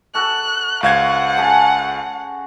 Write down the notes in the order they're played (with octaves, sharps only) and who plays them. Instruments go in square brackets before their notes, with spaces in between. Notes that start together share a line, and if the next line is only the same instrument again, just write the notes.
[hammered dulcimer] F#4 A4 [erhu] F#6
[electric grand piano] C#2 F5 G#6 [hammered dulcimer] F#4 C5 [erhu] F#5
[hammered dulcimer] C#3 A5